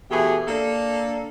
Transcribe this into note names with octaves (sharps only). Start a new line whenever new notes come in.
B2 E3 A3 G4 G#4
A#3 D4 A4